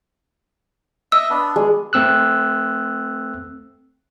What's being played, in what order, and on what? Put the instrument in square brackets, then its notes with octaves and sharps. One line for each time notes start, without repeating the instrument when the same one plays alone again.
[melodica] D#5 E5 [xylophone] E6
[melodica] B3 D4
[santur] G#3
[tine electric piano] A3 C4 E6 F#6